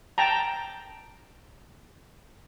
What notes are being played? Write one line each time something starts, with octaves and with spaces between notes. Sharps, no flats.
G5 A5 A#5